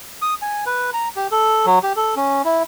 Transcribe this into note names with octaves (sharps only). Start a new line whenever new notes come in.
D#6
G#5
B4
A#5
G4
A4
F#3
G4
A4
C#4
E4